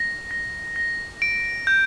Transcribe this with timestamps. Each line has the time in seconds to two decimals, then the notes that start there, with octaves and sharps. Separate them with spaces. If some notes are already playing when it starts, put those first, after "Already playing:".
Already playing: A#6
0.31 A#6
0.76 A#6
1.22 D7
1.67 G6